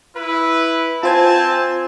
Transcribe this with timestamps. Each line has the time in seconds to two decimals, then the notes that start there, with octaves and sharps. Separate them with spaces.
0.16 E4 B4
1.03 C4 F4 C5 G#5 A5 G#6